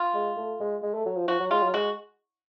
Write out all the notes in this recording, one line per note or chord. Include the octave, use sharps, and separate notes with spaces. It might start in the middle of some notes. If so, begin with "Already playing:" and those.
Already playing: F4
G#3
A3
G#3
G#3
A3
F#3
F3
F3 F#4
F#3
G#3 F4
F#3
G#3 F#4